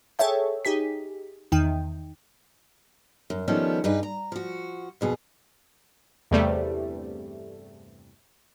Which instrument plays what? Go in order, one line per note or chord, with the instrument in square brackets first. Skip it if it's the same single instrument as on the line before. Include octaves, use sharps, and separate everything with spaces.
[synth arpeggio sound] G#4 A4 C#5 E5 G5
D#4 G4 G#4 B6
E2 D#3 D#4 G5
[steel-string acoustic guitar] F#2
D#3 F3 G3 A3 B3 C#4
G2 D#4 G#4 B4
A#5
F3 F#4
F2 B2 G#4
[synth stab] E2 G2 C3 G3 A3